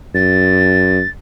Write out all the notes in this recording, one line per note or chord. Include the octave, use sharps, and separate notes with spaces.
F#2 A6